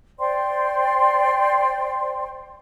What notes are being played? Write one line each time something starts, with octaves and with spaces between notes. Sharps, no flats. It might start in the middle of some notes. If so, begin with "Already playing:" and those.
C5 D5 G5 C6